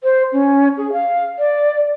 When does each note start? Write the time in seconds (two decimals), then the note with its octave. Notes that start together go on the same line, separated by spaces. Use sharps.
0.03 C5
0.33 C#4
0.77 G#4
0.93 F5
1.39 D5